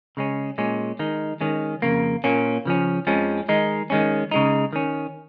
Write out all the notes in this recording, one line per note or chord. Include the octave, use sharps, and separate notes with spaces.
C#3 G#3 C#4
A#2 G#3 C#4
D#3 G#3 D#4
D#3 G#3 C#4
F2 C#3 A#3
A#2 A#3 C#4
C#3 F3 C#4
F2 F3 G#3 C#4
D#3 G#3 D#4
D#3 G#3 C#4
C#3 G#3 D#4
D#3 C#4